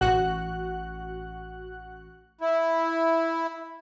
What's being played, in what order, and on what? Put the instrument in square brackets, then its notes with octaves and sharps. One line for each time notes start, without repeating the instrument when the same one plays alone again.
[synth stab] A1 F#4 F#5 F#6
[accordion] E4